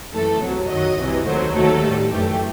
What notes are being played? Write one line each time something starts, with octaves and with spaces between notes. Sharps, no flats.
F#2 E3 A3 A4
C2 C3 F#3
F#2 D#3 F#3 D#5
C2 C3 E3
D#2 D#3 F#3 A3 C5
D#2 D#3 F#3 A3 A4
A2 G3
F#2 E3 A3 G4